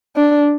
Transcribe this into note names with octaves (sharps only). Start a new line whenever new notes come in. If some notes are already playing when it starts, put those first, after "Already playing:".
D4